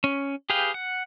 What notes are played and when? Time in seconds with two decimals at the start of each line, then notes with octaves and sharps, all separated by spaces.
0.04 C#4
0.50 G4 G#4 B4 F5 G5
0.74 F#5